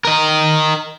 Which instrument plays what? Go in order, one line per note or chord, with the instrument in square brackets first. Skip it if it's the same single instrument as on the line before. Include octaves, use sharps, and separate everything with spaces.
[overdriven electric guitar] A#4 D#5